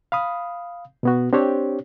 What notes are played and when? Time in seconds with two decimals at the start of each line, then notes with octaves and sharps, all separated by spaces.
0.12 F5 B5 D#6
1.03 B2 B3 F#4
1.33 C4 D4 G4 C5 C#5